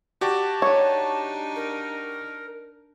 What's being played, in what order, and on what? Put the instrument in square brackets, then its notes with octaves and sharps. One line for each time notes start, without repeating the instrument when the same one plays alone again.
[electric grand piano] F#4 G4 D5 [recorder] A5
[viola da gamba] D4 D#4 [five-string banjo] C#5
[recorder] A#4